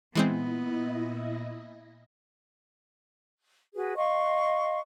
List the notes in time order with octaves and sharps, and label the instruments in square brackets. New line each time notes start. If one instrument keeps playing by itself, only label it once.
[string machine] A#2 E4 D#5 [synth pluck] E3 G#3 C4 [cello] B3
[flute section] F#4 G#4 B4
D#5 F5 C6 C#6